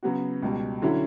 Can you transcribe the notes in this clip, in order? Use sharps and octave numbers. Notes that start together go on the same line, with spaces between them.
C#3 F#3 B3 F#4
C#2 B2 G3
D3 F#3 C#4 E4